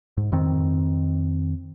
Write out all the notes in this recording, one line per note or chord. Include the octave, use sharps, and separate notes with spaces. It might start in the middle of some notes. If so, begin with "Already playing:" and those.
G#2
F2 D#3 C4